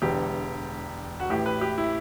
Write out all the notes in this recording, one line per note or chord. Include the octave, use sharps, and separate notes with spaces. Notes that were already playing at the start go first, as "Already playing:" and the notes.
E1 E2 D3 G4
F#4
A1 A2 E3 G4
B4
G4
E4